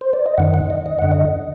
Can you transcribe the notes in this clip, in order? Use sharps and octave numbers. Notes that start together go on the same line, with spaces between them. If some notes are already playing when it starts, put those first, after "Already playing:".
C5
D5
D#5
F#2 D#3 F#5
F#5
D#5
D#5
F#2 D3 F#5
D#5